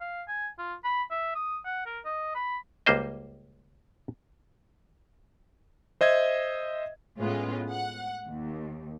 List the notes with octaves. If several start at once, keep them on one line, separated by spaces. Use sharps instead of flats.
F5
G#5
F4
B5
E5
D#6
F#5
A#4
D#5
B5
C#2 G3 A#3 C5 D#5
C5 D#5 E5 G#6
A2 G#3 B3 C#4 F4
F#5
D#2